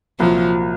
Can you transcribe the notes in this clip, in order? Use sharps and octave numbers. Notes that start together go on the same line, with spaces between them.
C2 A#2 F3 F#3